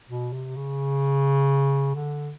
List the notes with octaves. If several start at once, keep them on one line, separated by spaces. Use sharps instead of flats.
B2
C3
C#3
D3